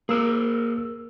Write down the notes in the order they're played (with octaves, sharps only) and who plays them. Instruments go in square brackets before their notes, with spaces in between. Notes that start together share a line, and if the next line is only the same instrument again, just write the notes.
[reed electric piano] A#3 E6 [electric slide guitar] G#4 A#4